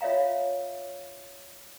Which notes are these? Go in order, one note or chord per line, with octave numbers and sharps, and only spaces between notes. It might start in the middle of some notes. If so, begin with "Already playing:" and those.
F4 C#5 E5 F5 A#5